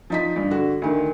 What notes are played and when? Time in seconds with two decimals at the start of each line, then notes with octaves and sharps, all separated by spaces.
0.10 F3 D#4 B6
0.36 G2
0.51 D3 F#4
0.82 D2 D#3